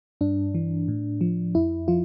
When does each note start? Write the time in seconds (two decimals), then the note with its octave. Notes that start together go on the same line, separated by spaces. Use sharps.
0.21 G2 D4
0.55 E3
0.88 A2
1.21 F3
1.55 F2 E4
1.88 F3 F4